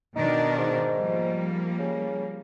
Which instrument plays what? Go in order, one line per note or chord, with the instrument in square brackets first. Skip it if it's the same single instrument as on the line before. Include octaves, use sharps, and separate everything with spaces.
[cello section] B2 D#3 D4 [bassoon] D#4
[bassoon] G#2
[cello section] F3 G3 A#3
[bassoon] C#3